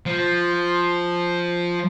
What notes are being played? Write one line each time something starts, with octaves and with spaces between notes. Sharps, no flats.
F3